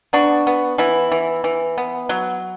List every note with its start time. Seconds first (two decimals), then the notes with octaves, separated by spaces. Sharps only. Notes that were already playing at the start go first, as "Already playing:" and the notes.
0.13 B3 D4 F#4
0.47 B3
0.78 E3 B3 E4
1.12 E3
1.44 E3
1.78 B3
2.09 F#3